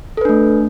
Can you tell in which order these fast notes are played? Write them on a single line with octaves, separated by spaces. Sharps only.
A4 B4 D4 A3